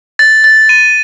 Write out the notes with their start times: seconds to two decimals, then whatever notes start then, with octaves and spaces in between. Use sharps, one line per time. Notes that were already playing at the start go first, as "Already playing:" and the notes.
0.19 A6
0.44 A6
0.69 D#7